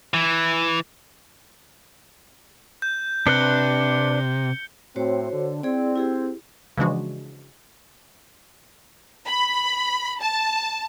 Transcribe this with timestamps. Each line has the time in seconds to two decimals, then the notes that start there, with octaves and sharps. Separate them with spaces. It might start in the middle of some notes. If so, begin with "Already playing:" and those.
0.14 E3
2.82 G6
3.27 C3 D4 B4 F#6 C#7 G7
4.96 A2 C4 F#4 C5 C#5
5.32 D3
5.63 C4 E4 G#4 D5
5.96 E4 G4 G#4
6.77 C#3 E3 F3 G#3 D4 F#4
9.27 B5
10.21 A5